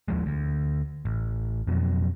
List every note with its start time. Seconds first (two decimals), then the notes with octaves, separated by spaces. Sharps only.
0.08 D#2 F3 G#3
0.26 D2
1.05 A1
1.67 F2 B2 F#3